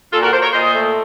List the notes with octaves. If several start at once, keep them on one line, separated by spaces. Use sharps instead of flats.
A#2 F4 A4
F#4 A#4
A#3 A4 C5
A#4 C#5
A#2 C5 D#5
A3